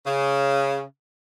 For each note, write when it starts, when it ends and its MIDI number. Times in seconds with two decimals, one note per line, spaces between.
0.07 0.83 49